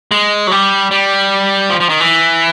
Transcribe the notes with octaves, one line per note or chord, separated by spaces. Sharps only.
G#3
F#3
G3
G3
F3
F3
D#3
E3